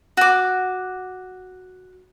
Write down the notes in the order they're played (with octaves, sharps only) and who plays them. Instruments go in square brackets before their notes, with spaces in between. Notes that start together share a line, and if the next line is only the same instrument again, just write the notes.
[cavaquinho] F#4 D6